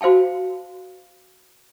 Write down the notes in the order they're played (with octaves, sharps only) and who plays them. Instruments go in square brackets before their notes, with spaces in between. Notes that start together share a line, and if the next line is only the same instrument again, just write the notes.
[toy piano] F#4 C5 F5 G5 A5